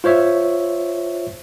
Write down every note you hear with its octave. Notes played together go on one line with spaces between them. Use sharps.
F4 C5 C#5 E5